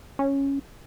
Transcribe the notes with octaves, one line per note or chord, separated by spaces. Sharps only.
C#4